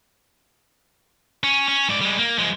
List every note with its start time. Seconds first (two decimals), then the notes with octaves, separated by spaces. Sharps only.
1.44 C#4
1.68 C#4
1.89 G#2 D5
2.01 G3 G#3
2.19 A#3
2.38 F3 G#3